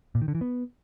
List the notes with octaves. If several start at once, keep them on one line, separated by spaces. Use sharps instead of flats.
A#2
D#3
D3
E3
B3